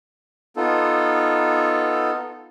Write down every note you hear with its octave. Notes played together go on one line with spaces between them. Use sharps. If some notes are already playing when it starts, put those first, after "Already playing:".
B3 D#4 F4 A4